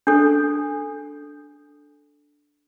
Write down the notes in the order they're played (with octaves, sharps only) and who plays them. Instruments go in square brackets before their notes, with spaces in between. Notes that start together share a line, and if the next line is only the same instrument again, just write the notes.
[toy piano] D4 A4